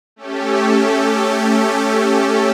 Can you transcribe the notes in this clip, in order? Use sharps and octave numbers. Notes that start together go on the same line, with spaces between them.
A3 C#4 G4 A4